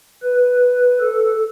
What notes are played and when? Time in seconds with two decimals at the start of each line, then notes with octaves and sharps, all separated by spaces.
0.23 B4
1.00 A4